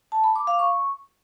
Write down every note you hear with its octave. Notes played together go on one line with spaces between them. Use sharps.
A5
B5
D6
F5
C#6